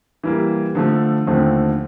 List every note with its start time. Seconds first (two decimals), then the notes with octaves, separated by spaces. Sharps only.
0.24 E3 G3 A#3
0.75 D3 F3 A3
1.27 D#2 D3 F3 A3 C4